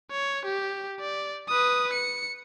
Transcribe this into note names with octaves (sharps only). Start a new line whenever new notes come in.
C#5
G4
D5
B4 D#6
C#7